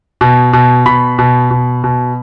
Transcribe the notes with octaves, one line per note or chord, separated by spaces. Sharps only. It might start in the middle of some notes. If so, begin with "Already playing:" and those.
B2
B2
B2 B5
B2
B2
B2